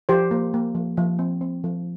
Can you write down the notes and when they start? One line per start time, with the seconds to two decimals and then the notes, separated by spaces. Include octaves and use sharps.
0.09 F3 G4 C5
0.31 A#3
0.54 A#3
0.75 F3
0.97 F3
1.19 C4
1.41 C4
1.64 F3